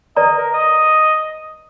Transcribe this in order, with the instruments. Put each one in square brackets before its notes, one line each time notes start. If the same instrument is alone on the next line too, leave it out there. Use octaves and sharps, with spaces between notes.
[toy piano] B4 D5 A#5 [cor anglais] D#5
[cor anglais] A#4
D#5